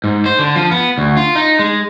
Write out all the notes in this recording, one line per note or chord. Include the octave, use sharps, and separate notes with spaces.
G#2
C5
D3
F3
B3
D2
F4
D#4
G#3